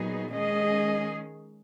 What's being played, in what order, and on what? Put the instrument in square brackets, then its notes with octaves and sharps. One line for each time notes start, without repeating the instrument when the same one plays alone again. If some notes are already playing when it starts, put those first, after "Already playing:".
Already playing: [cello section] A#2 F#3 B3 D#4 G#4
[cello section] D#3 G#3 C#4 G#4 [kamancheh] D#5